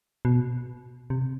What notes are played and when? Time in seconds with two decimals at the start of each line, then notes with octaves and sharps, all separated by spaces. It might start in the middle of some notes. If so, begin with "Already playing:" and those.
0.25 B2
1.10 C3